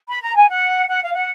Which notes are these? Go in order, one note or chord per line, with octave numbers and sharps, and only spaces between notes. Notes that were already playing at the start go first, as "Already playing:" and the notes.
B5
A#5
G#5
F#5
F#5
F5
F#5